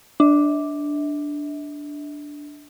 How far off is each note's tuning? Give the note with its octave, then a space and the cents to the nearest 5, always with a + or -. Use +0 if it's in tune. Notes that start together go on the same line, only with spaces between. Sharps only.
D4 +0 E5 -40